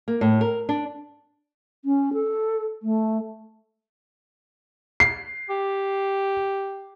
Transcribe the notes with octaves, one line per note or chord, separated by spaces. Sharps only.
A#3
A2
A#4
D4
C#4
A4
A3
C7
G4